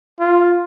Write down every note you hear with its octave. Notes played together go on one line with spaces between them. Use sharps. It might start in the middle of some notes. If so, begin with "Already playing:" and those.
F4